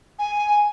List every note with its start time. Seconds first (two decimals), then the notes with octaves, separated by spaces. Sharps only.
0.19 G#5